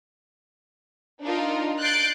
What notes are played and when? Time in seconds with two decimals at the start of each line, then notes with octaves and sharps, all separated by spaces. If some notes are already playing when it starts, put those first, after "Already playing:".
1.22 D4 D#4 F4 A#4
1.80 F#6 G6 A6 C7 D7